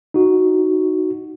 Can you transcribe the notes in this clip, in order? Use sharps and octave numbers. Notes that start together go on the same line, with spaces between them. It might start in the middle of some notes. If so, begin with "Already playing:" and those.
D#4 F#4